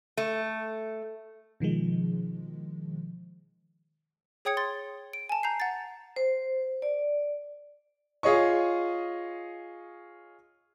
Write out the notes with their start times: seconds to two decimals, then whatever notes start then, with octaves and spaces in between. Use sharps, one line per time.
0.17 A3
1.60 B2 D#3 F3 G#3
4.45 G#4 C#5 G5 D#6 G#6 C#7
4.57 C6 A6
5.13 D7
5.29 G#5 A5
5.43 A#5 G6 C7
5.60 F#5 A6
6.16 C5
6.82 D5
8.23 F4 G#4 C#5 D#5 C#6